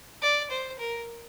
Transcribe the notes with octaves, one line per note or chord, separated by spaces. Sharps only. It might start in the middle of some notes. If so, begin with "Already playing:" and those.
D5
C5
A#4